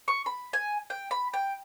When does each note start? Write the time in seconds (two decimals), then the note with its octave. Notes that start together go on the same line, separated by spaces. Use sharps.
0.08 C#6
0.26 B5
0.53 G#5
0.90 G5
1.11 B5
1.34 G5